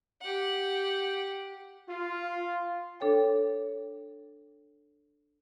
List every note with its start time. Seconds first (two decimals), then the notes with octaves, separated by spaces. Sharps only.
0.21 G4 F#5
1.89 F4
3.00 D4 A4 C#5 G5